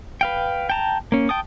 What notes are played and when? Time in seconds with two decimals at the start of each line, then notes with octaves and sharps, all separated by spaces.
0.21 B4 F5 G5
0.70 G5 A5 A#5
1.12 A#3 C#4
1.29 G5 A5 D#6